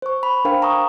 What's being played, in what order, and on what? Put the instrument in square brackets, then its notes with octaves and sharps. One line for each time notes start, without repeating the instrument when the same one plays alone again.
[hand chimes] C5 C#6
B5
D4 A#4 C5 F5 G5
A#5 C#6 D#6